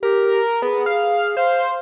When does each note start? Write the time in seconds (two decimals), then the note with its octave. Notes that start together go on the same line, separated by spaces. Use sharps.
0.03 G4 A#4
0.62 B3 G#4
0.86 F5
1.37 C5 F5